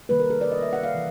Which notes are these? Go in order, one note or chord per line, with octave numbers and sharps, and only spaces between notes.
C3 D#3 G3 A#3 B4
A#4
A4
D5
D#5
E5
F#5
F5
C3 E3